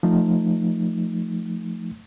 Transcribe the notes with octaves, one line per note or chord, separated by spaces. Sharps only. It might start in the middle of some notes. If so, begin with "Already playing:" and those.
F3 A3 D#4